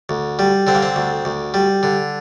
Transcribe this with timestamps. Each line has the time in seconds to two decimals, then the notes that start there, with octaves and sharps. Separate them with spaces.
0.09 D2
0.39 G3
0.67 D3 C4
0.75 A#3
0.82 C4
0.96 D2
1.25 D2
1.54 G3
1.83 D3